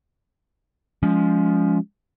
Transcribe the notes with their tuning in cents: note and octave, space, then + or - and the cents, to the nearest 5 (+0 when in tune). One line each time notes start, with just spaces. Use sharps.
F3 +5 G#3 +0 C#4 +25